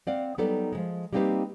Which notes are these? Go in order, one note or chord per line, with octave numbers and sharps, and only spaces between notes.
C4 D5 F5 F#5
F#3 G3 B3 D#4 A4 D5
F3 F#3 G#3
G3 A#3 C4 D#4 G4 B4